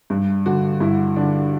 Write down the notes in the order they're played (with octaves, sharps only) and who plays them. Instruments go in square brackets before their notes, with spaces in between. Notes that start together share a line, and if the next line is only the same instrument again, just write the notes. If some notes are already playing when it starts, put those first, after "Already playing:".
[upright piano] G2
D3 F#4
G2 E4
D3 D4